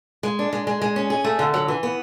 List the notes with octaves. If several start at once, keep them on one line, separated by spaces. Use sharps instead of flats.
G#3
D4
G#3
G#3
G#3
C#4
G#4
A3
D3
F#3
E3
B3